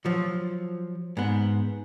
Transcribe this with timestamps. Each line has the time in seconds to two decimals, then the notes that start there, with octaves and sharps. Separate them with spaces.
0.05 F3 F#3
1.17 G#2 B3